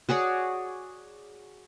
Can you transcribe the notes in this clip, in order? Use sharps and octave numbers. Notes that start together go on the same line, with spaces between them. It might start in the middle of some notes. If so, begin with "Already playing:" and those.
F#4 G#4 C#5 D5